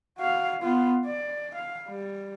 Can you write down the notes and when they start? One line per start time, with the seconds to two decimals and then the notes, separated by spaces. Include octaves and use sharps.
0.17 F#4 F5
0.61 B3 F4
1.05 D5
1.54 F5
1.88 G3